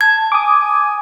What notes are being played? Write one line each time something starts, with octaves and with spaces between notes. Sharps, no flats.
A5 G#6
G#5 D6 D#6